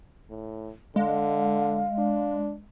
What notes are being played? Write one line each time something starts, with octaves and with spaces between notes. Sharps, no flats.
A2
D3 G#3 F5
D4